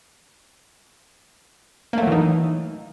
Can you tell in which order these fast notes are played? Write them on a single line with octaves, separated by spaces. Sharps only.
A#3 A3 F#3 E3 D#4